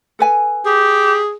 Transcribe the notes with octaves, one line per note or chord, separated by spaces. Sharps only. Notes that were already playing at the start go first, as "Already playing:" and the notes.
A4 B4 G#5
G4 G#4